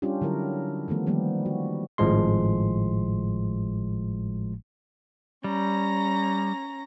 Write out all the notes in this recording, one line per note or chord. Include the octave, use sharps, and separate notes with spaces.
G3 C#4 D4 F4 G4
D3 F#3 E4 A#4
D#3 F3 A3 B3
D#3 F3 G3 A#3 B3 G4
F#4
G#1 A2 F3 G#3 C6
G3 C#4 A#5 A#6